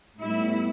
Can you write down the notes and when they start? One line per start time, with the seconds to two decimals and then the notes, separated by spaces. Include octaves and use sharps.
0.20 A2 G3 B3 E4